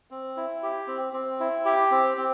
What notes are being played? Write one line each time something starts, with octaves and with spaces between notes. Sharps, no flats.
C4
E4
G4
C4
C4
E4
G4
C4
C4